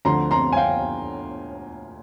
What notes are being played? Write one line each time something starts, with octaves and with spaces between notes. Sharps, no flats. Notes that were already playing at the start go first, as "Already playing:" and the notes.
D2 D3 F3 A#5 C6
A#5 C6
G#5
F5 G5